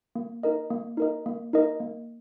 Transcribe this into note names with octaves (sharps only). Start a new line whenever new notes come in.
A#3
D#4 A#4 D#5
A#3
D#4 A#4 D#5
A#3
D#4 A#4 D#5
A#3